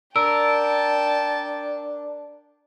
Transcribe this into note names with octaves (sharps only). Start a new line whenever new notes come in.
D4 A#4 G5 A5 E6